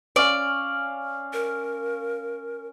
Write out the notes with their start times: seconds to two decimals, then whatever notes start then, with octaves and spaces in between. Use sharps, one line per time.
0.16 C#4 D5 F5
1.33 A#4